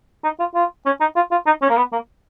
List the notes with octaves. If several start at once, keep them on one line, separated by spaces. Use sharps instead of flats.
D#4
F4
F4
C#4
D#4
F4
F4
D#4
C#4
A#3
B3
A#3